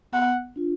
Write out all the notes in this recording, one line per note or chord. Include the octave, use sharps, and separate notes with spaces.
B3 F#5
D4 F4